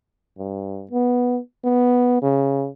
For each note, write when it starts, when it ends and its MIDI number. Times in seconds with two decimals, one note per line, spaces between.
0.38 0.86 43
0.91 1.39 59
1.64 2.22 59
2.22 2.68 49